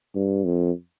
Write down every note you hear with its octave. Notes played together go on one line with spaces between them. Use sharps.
G2
F2